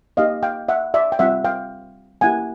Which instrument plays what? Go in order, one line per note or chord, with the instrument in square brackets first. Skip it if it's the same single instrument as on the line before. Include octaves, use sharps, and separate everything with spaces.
[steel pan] A#3 D#4 G4 D#5 F5
F5 G5
E5 F#5
D5 E5
G5
G3 C4 F4 E5 F#5
F5 G5
A#3 C#4 E4 G4 F#5 G#5